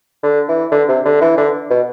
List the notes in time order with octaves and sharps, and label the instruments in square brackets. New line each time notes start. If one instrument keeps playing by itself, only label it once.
[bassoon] D3
E3
D3
C3
D3
E3
D3
B2